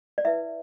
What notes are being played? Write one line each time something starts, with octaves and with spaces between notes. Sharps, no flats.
D5
E4 B4 E5